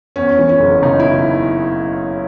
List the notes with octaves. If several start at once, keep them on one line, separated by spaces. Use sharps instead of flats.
E2 C#4
E3
C#4
F#1
C#3 D#4
E4